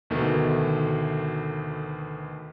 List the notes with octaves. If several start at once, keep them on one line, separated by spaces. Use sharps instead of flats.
D2 B2 D#3 A3